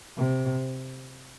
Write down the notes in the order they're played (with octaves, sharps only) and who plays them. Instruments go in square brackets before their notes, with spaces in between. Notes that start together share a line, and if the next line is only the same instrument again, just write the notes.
[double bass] C3